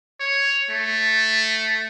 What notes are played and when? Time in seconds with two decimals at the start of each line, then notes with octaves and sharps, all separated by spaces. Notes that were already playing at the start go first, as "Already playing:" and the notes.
0.20 C#5
0.70 A3